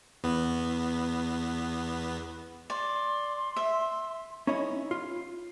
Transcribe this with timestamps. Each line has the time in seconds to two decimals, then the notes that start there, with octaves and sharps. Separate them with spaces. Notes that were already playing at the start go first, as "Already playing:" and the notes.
0.24 E2 B3
2.70 D5 C6
3.56 E5
4.47 C#4 D#4 E4 C#5 D#5
4.91 F4